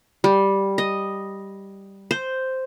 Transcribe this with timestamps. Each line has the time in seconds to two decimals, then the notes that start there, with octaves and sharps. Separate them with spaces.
0.24 G3
0.78 D#5
2.11 C5